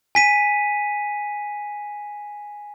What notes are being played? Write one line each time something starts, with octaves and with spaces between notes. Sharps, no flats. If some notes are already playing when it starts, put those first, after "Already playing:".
G#5 B6 D#7